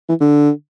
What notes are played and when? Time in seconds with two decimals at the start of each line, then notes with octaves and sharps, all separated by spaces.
0.09 E3
0.21 D3